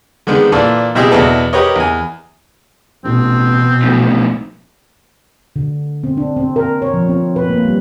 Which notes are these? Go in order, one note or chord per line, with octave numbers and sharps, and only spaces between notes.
D3 D#3 G#3 B3 C4
A#2 E3 D4 A4
B2 C4 E4 G4 G#4
E2 B2 D4 E4 A4 B4
G4 A#4 B4 C#5 D#5
E2 G#5
A1 B2 C4
B1 F2 A2
D3
C4
D4
C4
A#4
C#5
F3
C4
B4
A#3
G3